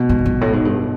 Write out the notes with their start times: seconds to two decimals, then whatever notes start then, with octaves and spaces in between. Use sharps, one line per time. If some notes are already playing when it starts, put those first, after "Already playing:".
Already playing: B2
0.09 G#2
0.26 G2
0.41 A2
0.53 G#2
0.65 G2